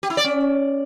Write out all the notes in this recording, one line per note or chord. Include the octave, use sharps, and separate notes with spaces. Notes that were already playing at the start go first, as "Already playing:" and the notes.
G4
E4
D5
C#4